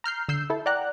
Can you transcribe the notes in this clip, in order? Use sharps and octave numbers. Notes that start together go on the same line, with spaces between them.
A#5 F6 G6 C7
D3 E6 G6 C7
E4 A4
D5 F#5 G5 A#5 F#6